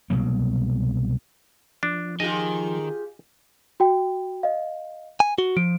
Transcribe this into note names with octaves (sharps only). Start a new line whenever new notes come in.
C2 B2 F#3 A#3
F3 D4
D#3 F4 G4 G#4 D#5
F#4 G5
D#5 F5
G#5
F#4 G7
F3 D7